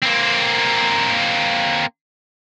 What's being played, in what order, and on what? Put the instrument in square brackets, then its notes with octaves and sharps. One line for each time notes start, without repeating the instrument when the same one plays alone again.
[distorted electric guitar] A#3 C4